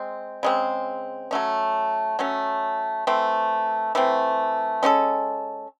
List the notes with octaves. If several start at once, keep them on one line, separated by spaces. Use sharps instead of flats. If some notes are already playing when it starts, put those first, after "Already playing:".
Already playing: G#3 C4
C#3 G#3 C4
F#3 A3 C#4
F#3 A3 C#4
E3 A3 C4
E3 A3 C4
G#3 C#4 F#4 A4